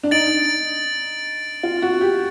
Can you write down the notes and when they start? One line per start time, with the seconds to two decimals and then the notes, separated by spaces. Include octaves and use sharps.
0.03 D4
0.11 D#4 A6 D7 F#7
1.63 F4
1.82 F#4
2.01 G4